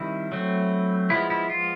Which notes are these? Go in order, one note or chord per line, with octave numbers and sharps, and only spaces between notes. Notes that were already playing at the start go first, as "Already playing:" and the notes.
Already playing: D#3 G3 C4 E4
F#3 A3 C4
F3 G#3 B3 E4
E4
F4